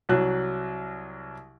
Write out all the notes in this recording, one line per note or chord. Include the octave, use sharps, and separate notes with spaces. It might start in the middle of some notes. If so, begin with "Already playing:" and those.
C2 F#3 F#6